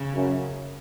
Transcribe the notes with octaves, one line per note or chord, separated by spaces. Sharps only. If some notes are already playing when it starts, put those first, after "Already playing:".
Already playing: C#3
F#2